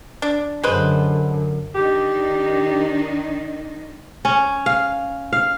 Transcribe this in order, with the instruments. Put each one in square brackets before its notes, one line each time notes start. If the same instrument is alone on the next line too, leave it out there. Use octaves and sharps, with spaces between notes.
[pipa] D4
[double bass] F#2 D3 [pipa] G#3 B4 C5
[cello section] D#3 D4 D#4 [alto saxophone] G4
[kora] C#4
F5
F5